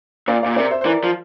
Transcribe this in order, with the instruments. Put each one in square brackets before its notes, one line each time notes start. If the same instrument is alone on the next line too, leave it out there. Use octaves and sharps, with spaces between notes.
[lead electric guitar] A#2 [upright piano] D5 F5
[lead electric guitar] A#2 [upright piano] D5 F5
[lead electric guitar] C3 [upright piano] A#4 D5
[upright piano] C5 E5
C5
[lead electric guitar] E3 [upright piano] A#4 D5
[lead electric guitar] F3